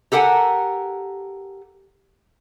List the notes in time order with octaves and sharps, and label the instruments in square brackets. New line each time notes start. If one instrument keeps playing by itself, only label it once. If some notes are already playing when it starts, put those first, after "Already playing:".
[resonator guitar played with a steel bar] G4 A4 A#4 F#5 G#5